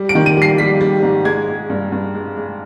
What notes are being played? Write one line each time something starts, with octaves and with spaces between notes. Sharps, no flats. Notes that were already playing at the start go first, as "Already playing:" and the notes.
Already playing: G3
D7
D#3
D#7
G3 C7
G3 B6
G3
G#2
G#3 G#6
G#3
G2
G2
G#3
G#3